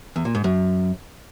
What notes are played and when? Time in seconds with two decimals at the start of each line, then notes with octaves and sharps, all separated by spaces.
0.16 E2
0.25 A#2
0.35 G#2
0.44 F#2